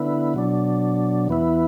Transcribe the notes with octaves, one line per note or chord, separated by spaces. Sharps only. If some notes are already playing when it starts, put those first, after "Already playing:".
Already playing: D3 B3 E4
B2 F#3 D4
E2 E3 B3 E4